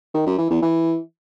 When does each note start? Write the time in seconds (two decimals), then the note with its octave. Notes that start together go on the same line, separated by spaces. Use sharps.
0.14 D#3
0.26 F#2
0.38 E3
0.50 E2
0.62 E3